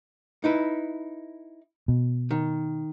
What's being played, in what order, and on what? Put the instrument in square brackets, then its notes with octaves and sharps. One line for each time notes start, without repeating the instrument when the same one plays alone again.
[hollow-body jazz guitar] D#4 E4 B4
[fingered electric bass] B2
[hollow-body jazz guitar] D#3